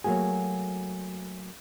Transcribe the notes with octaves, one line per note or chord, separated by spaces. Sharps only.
F#3 A3 A#3 F#4 G#4